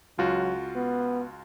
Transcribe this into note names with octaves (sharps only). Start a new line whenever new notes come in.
C#2 F#3 F4 F#4
B3